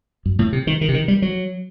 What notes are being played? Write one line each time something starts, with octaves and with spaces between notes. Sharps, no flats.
F#2
A2
C3
D#3
D#3
C3
D#3
G3
F#3